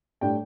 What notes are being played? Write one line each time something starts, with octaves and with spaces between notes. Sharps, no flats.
A2 G3 D4 G5